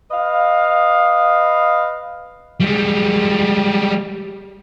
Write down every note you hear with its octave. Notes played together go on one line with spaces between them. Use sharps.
B4 D#5 F5
G3 G#3